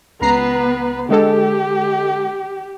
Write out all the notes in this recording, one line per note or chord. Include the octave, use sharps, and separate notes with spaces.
C#2 B3 B4 A#5 C7
D3 G#3 G4 A4